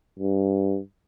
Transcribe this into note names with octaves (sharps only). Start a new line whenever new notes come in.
G2